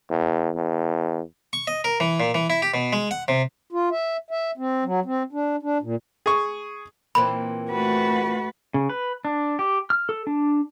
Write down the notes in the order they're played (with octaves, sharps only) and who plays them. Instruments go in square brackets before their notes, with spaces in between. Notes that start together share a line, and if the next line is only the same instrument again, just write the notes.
[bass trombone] E2
E2
[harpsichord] C#6
D#5
A#4
E3
A#2
E3
E4
G4
B2
G#3
F#5
C3
[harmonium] F4
E5
E5
C4
F#3
C4
D4
D4
A#2
[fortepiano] G#4 C#6
[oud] A#2 E3 C4 [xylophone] B5
[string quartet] A3 F#4 [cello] B4
[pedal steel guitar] C#3
B4
D4
G4
F6
A4
D4